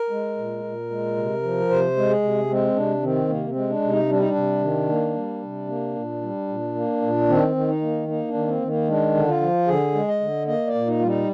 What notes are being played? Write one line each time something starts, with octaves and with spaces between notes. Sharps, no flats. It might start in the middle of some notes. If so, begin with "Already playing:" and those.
Already playing: A#4
G#3
A#2
A#2
G#3
C3
F3
C3 C5
G#3
G#4
C3
G#3 C4
C3 D4
D#3 C4
C3 A#3
C4
G#3
D4
C3
D#4
G3 D4
D#4
D4
C3
D#3
A#3
G3
C3
A#3
A#2
G3
A#2
A#3
A#2
D#3 C4
D#3
D#4
A#3
A#3 D#4
D4
D#3
C4
D#3
A#3
G#3 D4
D3
F4
F3
D3 G#4
G#3
D#5
D3
A#3 D#5
D5
A#2
D#4
G3 F4
D#4